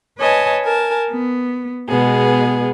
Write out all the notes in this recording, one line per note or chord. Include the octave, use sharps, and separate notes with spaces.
B4 C#5 D#5 G#5 A5
A#4 G#5 A5
B3
B2 G#3 B3 G#4